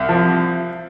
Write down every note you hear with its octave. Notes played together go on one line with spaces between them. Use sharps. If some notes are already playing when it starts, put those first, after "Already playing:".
Already playing: C2
F3